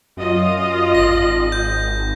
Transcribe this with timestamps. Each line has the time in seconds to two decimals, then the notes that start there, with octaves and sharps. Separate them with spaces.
0.17 F#2 F4 D#5
0.95 G#1 A#6
1.52 G6